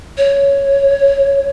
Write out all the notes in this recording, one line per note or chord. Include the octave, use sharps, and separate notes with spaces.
C#5